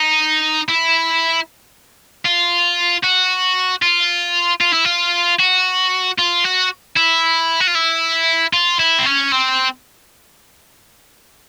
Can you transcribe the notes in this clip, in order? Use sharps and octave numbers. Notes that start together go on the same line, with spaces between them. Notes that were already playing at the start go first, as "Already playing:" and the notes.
Already playing: D#4
E4
F4
F#4
F4
F4
E4
F4
F#4
F4
F#4
E4
F#4
F4
E4
F4
E4
C4
C#4
C4